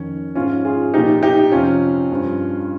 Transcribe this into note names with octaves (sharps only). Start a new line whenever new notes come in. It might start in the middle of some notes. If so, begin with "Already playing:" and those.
Already playing: F2 D#3 C#4
G#2 F3 C#4 F4
F4 G#4
A#2 F3 D#4 G4
D#4 G4
F2 C3 F3 C#4 F4
G2 F3